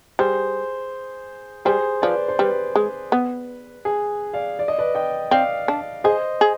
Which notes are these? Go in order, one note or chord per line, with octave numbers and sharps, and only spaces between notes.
G3 G#4 C5
G3 G#4 C5
F3 B4 D5
C5
G3 B4
G#3
B3
G#4
D5 F5
D5
D#5
B4 D5
D#5 G5
C4 D5 F5
D4
G#4 C5 D#5
G#4